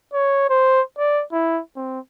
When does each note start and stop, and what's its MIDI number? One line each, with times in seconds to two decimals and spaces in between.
0.13 0.47 73
0.50 0.81 72
0.98 1.23 74
1.33 1.61 64
1.76 1.99 60